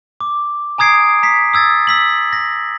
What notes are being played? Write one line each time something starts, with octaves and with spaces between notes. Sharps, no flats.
D6
G#5 A#5 D#6 G#6 C7 D7
A#5 B6 C7
D#6 E6 G#6 A6
E6 B6 F#7
A#6